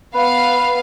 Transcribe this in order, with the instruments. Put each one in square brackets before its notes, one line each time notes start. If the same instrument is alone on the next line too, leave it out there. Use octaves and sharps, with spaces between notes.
[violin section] B3 F5 [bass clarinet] B4